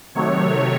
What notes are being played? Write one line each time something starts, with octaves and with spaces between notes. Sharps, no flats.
C3 D#3 F#3 A3 C#5